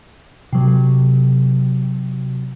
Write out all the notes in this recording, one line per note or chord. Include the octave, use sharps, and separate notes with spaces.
C3 F#3